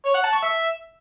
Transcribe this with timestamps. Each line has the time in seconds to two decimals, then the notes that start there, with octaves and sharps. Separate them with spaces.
0.05 C#5
0.14 F#5
0.24 A5
0.33 C#6
0.42 E5